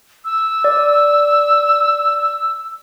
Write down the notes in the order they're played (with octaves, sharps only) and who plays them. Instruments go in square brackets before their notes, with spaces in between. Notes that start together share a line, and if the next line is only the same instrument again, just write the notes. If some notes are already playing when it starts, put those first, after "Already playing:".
[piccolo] E6
[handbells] D5